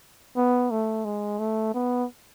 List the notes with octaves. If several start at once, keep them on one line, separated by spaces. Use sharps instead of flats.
B3
A3
G#3
A3
B3